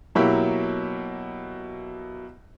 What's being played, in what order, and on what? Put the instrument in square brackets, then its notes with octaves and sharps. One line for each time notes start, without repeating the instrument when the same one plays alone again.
[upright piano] B2 F#3 A#3 E4 G4